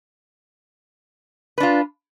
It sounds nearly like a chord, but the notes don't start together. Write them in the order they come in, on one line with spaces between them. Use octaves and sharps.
B4 D4 F4